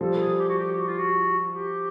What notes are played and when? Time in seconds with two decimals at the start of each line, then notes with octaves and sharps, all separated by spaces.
0.01 F3 G3 A4
0.19 G#4
0.39 G4
0.49 F#4
0.58 G4
0.77 F#4
0.87 F4
0.98 F#4
1.53 G4